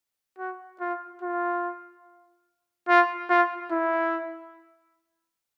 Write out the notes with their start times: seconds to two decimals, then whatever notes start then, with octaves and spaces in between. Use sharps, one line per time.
0.39 F#4
0.81 F4
1.22 F4
2.89 F4
3.30 F4
3.72 E4